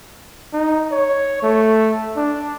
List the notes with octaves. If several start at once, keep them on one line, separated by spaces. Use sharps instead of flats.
D#4
C#5
A3
D4